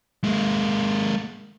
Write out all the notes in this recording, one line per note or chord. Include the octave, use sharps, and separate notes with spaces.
G#3 A#3